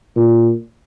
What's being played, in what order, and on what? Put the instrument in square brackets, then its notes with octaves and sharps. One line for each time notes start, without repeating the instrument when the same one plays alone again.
[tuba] A#2